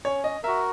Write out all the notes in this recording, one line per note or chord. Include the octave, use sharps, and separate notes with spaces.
C#4 C#5
D#5
F#4 A#4 E5